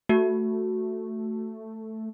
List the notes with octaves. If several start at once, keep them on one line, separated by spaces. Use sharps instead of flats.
A3 F#4